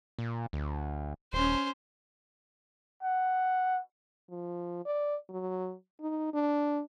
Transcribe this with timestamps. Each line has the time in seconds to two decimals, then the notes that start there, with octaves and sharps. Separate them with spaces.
0.19 A#2
0.53 D2
1.33 D#1 C#4 C5
3.03 F#5
4.30 F3
4.85 D5
5.29 F#3
6.01 D#4
6.34 D4